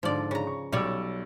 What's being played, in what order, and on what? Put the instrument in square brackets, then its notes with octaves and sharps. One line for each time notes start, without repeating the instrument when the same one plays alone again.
[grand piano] G#2 D3 [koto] F3 D5
[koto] C#3 A#5
[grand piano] C#6
[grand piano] B1 E6 [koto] G3 C#5 D5